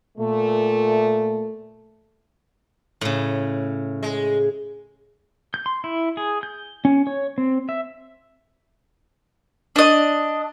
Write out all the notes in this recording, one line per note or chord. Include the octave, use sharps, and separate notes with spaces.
A#2 A3
A2 C#3
G#3
G6
C6
E4
G#4
G6
C#4
C#5
C4
E5
D4 D#5